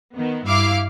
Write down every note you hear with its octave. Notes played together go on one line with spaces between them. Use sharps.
D#3 B3
G2 E4 F5 D6 F6